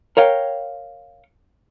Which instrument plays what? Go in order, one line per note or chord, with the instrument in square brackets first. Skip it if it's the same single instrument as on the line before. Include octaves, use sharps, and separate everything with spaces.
[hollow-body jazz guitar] A#4 C#5 F5 G5